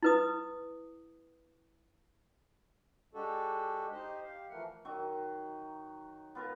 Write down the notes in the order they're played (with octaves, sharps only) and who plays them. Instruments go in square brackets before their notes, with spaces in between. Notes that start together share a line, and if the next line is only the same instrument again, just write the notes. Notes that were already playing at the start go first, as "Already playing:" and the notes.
[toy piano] E4 B4 D#6
[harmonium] G#3 D4 F#4 G4 A4
D#4 G4 C5 D#5
G4 F5
E3 F3 A3 A#4 F#5
[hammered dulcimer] D#3 F#3 D#4
B3 F4 A#4